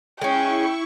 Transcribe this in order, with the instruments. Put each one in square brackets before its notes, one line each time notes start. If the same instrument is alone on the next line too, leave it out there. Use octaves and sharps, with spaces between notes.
[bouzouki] G#3 C#4 [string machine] E4 C#6 [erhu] G5